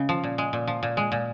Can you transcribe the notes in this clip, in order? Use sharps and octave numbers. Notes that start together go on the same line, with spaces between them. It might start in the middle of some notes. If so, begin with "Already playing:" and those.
Already playing: C#3 G#3
F3
A#2
G#3
A#2
F3
A#2
G#3
A#2